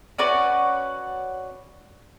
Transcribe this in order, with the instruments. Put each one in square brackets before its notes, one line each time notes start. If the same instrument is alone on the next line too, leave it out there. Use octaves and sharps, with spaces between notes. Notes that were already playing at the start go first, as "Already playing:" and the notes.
[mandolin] C#4 F#4 B4 D5